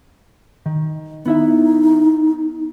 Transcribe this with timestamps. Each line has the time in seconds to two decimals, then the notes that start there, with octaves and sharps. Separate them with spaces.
0.66 D#3
1.26 B3 D#4 E4 E5